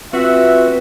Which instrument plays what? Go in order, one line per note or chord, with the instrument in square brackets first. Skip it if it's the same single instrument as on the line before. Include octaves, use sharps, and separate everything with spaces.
[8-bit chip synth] C4 F4 B4 [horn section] F#4 E5